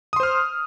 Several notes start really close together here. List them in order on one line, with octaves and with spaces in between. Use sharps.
D#6 C6 C5 F6